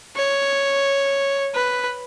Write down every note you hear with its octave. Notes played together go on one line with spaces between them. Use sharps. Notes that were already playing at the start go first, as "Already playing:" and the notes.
C#5
B4